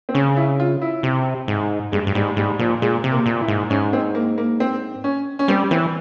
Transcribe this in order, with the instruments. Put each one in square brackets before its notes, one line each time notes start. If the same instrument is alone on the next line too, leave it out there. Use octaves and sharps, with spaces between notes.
[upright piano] C4
[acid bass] C#3 [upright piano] C#4
[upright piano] E4
F4
E4
[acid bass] C3
G#2
[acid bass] G2 [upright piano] G#3
[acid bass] G2
[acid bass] G#2 [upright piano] G3
[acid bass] G#2 [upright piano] G3
[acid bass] A#2 [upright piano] F3
[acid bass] A#2 [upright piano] G#3
[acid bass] C3
[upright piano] A#3
[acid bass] A#2
[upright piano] E4
[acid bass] G#2
[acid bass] G#2 [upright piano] C#4
[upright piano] C4
A#3
A#3
C4
C#4
C#4
[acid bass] G3 [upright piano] C4
[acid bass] E3 [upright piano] C4